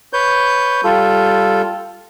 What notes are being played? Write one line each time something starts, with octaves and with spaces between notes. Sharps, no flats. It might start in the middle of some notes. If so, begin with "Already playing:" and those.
B4 C#5 G6
G3 F4 A4